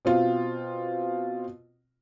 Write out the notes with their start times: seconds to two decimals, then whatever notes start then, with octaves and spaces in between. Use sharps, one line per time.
0.05 B2 C4 F4